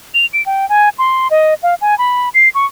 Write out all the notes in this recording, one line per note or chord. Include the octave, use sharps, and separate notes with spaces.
F7
D7
G5
G#5
C6
D#5
F5
G#5
B5
C7
C#6